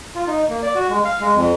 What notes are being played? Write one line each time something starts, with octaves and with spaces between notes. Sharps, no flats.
F4
D#4
A#3
D5
F#4
G#3
F5
G#3
F2